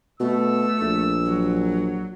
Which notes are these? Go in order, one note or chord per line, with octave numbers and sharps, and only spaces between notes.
B2 A3 E6
A#1
F#3